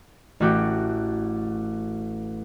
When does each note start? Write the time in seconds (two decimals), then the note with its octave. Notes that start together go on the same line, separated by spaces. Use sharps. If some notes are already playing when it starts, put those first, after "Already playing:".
0.40 A1 A3 F#4 G4 G5